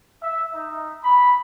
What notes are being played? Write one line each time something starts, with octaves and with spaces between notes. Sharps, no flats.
E5
D#4
B5